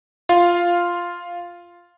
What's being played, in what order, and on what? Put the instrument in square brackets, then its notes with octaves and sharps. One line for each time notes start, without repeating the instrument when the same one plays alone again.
[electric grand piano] F4 F5